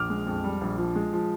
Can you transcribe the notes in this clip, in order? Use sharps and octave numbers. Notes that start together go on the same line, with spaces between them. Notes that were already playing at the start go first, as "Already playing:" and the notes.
Already playing: A#1 D6 F6
G#3
F2
G3
A#1
F3
G#3
F3